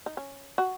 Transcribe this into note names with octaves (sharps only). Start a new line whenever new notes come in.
D#4
C#4
F#4